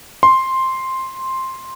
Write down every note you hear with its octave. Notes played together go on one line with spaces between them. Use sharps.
C6